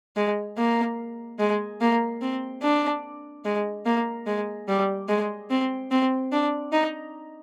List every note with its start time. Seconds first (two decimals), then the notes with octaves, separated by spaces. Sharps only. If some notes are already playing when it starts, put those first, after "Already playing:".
0.16 G#3
0.58 A#3
1.39 G#3
1.81 A#3
2.22 C4
2.62 D4
3.45 G#3
3.86 A#3
4.27 G#3
4.68 G3
5.09 G#3
5.51 C4
5.91 C4
6.32 D4
6.73 D#4